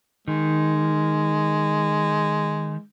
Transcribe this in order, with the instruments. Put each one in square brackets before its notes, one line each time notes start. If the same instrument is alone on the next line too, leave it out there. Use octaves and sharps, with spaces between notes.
[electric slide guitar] D#3 [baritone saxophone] G#3